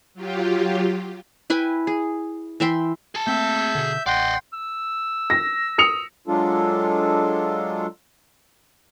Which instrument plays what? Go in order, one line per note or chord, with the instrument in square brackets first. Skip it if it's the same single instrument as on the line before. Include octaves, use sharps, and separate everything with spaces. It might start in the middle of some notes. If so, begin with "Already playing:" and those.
[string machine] F#3 F4 G4
[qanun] E4 B4 G5 G#5
G#4
E3 E5 G5 C6
[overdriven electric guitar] G#4 A5
[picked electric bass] A3 A#3 C4 [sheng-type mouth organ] E5 G6
[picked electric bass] B2 D3
[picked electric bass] A1 [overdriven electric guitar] D5 D#5 [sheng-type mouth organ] F#5 G5 C6
[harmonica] E6
[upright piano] A#6
D#6 C#7 F7
[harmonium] F#3 G#3 D4 F4 A4